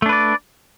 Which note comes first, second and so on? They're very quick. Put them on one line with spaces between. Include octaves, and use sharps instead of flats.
A3 D4 B4 D5